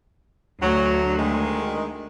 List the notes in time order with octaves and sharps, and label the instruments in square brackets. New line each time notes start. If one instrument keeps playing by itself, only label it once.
[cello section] D2 [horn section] F#3
[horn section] D#3 G#3